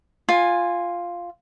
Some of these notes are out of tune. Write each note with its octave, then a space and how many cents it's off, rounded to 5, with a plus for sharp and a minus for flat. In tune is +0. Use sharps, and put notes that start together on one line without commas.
F4 +0 G#5 -10